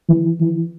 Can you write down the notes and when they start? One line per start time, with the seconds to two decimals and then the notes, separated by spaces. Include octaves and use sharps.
0.09 E3
0.40 E3